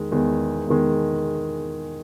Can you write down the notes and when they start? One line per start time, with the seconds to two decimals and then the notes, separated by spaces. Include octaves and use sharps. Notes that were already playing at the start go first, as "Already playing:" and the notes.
Already playing: E2 D#3 G#3
0.12 E2 D#3 G#3
0.67 E2 D#3 G#3